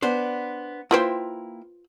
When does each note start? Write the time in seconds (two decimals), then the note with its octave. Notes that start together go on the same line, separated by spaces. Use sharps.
0.02 B3 D4 C5
0.91 A#3 E4 F4 B4 C5 G5